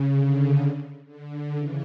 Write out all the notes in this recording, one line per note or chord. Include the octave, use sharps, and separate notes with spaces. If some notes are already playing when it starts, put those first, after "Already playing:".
Already playing: C#3
D3
D3
C#3 E3